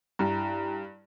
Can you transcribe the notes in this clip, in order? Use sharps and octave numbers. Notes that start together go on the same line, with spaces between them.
G2 E4 A#5